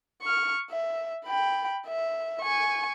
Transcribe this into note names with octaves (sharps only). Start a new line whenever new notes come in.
C#6 F6
E5
G5 B5
E5
G#5 C#6